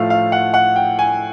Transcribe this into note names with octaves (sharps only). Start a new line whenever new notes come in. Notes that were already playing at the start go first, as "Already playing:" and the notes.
Already playing: A2 F3 A3 F5
F5
F#5
F#5
G5
G#5